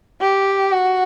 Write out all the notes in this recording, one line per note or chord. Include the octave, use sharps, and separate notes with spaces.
G4
F#4